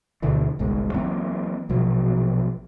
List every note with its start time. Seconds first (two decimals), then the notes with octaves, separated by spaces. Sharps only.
0.22 D2 B2 D3 E3
0.59 G1 C2 G#2
0.94 E3 F#3 A#3 C4
1.69 A#1 B2 F3 F#3